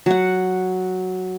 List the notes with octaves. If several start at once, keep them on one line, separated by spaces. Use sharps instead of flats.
F#3 F#5